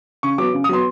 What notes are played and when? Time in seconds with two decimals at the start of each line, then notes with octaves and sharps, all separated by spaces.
0.23 C#3 C#6
0.38 F#3 B3 D6
0.53 C#3
0.64 D#6
0.69 F#3 B3 C6